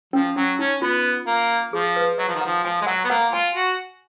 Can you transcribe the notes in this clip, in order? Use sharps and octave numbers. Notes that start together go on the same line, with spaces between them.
F3 C#4
F#3 C#4
C#4 D#4
B3 F4
A#3
F3 G#4
B4
F#3 D#5
F3
D#3
F3 F#5
F3 G#5
G#3
F#3 F#5
B3
A#3 F#5
F4 G#5
F#4